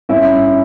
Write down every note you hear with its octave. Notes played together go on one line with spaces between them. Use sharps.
G2 C#4 E4